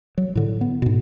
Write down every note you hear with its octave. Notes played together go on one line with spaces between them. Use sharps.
F#3
A2 D3
B3
G#2 B2